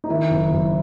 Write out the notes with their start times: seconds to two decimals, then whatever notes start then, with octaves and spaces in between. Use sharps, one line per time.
0.04 D#4
0.09 D#3 E4
0.31 F#1
0.52 F#1